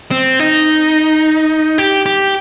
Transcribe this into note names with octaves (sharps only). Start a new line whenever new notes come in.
C4
D#4
G4
G4